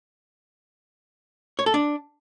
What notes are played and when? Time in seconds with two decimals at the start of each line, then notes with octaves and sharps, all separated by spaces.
1.59 C#5
1.66 A4
1.74 D4